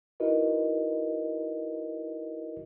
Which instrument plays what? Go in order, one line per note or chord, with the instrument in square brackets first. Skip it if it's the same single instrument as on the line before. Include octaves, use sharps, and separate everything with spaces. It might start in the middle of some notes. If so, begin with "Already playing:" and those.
[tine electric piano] D#4 E4 F#4 A#4 B4 D#5